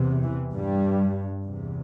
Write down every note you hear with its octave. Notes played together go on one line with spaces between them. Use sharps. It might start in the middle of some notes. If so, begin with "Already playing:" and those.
Already playing: E2 C3
E3
G2 G3
E2 C3